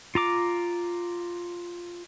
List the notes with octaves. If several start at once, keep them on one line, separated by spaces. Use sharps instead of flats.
F4 A#5 D6